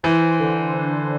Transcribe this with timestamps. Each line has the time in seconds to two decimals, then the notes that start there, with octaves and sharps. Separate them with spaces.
0.03 E3 C5
0.39 D3
0.74 D4